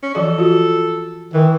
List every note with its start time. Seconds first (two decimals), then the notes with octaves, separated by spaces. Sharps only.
0.03 C#4
0.15 E3 F3 A4 D5
0.38 F4 F#4
1.34 D#3 E3